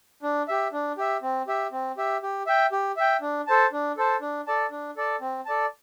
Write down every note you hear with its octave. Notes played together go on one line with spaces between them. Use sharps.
D4
G4 E5
D4
G4 E5
C4
G4 E5
C4
G4 E5
G4
E5 G5
G4
E5 G5
D4
A4 C5 A5
D4
A4 C5 A5
D4
A4 D5 A5
D4
A4 D5 A5
C4
A4 D5 A5